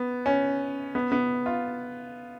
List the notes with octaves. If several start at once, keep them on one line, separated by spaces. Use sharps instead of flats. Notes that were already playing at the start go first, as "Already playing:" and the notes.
Already playing: B3
C#4
B3
B3
F4